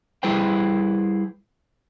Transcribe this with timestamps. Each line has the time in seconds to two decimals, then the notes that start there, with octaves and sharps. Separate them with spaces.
0.23 G3 E4 G#4 B4 C5 G5